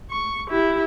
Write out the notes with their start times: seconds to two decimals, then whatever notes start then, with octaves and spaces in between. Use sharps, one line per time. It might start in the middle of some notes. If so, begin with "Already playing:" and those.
0.10 C#6
0.50 E4 G4